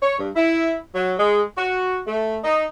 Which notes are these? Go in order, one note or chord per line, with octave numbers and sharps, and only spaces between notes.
C#5
G2
E4
F#3
G#3
F#4
A3
D#4